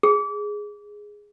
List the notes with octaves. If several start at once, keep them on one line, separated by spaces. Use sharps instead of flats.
G#4